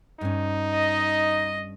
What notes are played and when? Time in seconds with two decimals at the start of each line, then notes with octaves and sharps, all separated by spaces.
0.21 G2 C#4 D#4
0.74 D#5